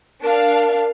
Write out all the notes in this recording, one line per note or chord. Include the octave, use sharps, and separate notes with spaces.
D4 A#4 F5